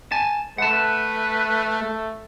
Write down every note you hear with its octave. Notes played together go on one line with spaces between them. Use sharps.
G#5 A5
A3 B4 F#5 A5
A3